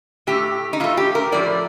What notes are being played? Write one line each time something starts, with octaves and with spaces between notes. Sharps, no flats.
A2 A3 G4
D#4
A2 A3 F4
G4
A#4
A2 F3 A3 D5